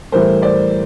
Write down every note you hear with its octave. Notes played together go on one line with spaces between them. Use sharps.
A2 E3 G3 A#4 C5
C5 D5